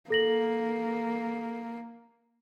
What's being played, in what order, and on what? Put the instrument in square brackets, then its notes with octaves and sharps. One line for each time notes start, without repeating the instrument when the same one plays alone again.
[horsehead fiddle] A#3 [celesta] A4 A#6 F#7